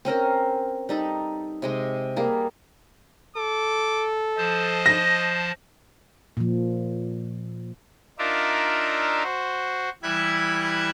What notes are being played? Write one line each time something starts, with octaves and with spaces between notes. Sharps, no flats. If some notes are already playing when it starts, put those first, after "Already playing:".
C4 C#4 A#4 C5
G3 D#4 A4
C3 G#3 D#5
G3 A#3 G#4
A4 D6
F3 C5 D#5 A5
A#6
A#2 F3
D4 D#4 F4 A#4 D5 E5
F#4 C5
E3 G3 E4 E5 F#6 G#6